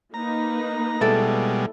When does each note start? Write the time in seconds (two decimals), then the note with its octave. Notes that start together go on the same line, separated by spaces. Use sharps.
0.14 A#3 D#4 B4 A#5
1.01 B2 G3 G#3 E4 A4 D5